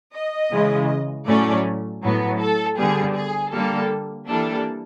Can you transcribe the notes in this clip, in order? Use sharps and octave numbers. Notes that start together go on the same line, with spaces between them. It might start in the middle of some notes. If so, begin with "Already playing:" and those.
D#5
C#3 E3 G#3
A2 F#3 A3 C#4 D5
A2 F#3 B3
A4
D3 G3 B3 G#4
G#4
D3 G3 A#3 A4
E3 G3 A#3 D4 A4